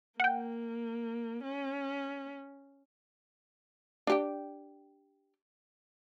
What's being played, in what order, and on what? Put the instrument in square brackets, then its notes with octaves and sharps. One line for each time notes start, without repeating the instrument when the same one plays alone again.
[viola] A#3 [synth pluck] F#5 G5
[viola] C#4
[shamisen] D4 G4 G5